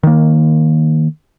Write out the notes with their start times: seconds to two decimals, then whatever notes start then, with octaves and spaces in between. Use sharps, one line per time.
0.03 D#3 A#3